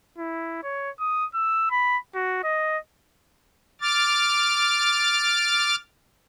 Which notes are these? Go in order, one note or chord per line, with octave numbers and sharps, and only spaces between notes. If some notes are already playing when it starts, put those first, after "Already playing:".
E4
C#5
D#6
E6
B5
F#4
D#5
D6 F6 A6